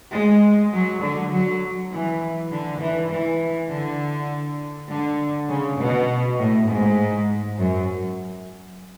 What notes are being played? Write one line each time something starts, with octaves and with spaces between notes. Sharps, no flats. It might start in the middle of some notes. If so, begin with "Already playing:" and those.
G#3
F#3
D3
F#3
E3
D3
E3
E3
D3
D3
C#3
B2
A2
G#2
F#2